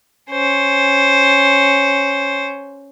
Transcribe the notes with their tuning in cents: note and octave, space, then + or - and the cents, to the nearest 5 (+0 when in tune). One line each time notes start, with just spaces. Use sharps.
C#4 +0 C5 +0